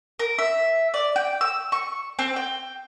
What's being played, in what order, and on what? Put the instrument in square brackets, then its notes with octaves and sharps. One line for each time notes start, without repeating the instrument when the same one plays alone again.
[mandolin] A#4
E5
D5
G5
E6
C#6
C4
G5